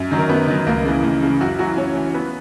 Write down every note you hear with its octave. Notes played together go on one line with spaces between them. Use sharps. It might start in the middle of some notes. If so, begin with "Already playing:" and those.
Already playing: F#2
D#3 F#3
A#4
F#2 B3 B4
D#3 F#3
C#2 A#3 A#4
C#3 E3
C#2
C#3 E3
F#2 F#3 F#4
E3 F#3 F#4
F#2 C#4 C#5
E3
B3 B4